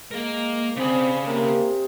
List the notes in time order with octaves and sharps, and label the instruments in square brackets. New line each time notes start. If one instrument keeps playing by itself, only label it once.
[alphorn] G#3 [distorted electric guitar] A#3 A#4
[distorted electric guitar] C#3 B5 [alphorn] C4 [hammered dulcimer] G#4 D5
[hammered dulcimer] C3 [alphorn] A#3